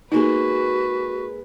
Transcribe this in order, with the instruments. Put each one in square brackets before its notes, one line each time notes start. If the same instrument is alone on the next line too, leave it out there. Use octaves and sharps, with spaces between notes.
[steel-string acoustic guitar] G#3 A#3 G#4 [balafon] D#4 [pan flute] F#4 [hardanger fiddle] B4